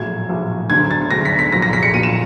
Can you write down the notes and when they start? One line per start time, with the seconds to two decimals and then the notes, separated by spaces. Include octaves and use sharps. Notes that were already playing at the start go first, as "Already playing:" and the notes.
Already playing: A#1 A2 F#3 G#6
0.29 A#1 A2 F#3
0.70 D2 D3 F#3 G#6
0.91 A6
1.11 D2 D3 F#3 A#6
1.25 B6
1.39 B6
1.52 A#1 A#2 F#3 A#6
1.62 A#6
1.73 B6
1.83 C#7
1.93 A#1 A#2 F#3 D#7
2.03 E7